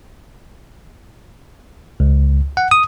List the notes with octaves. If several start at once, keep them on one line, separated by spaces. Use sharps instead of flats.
C#2
F#5
D#6